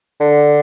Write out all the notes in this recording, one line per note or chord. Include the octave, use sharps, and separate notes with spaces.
D3